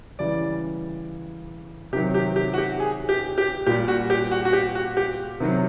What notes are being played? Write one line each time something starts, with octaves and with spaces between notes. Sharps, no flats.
C#3 E3 G3 D5
C3 D#3 F#3 G4
G4
G4
F#4
G4
G#4
G4
G4
A#2 G3 G4
F#4
G4
F#4
F#4
G4
F#4
G4
C3 D#3 F#3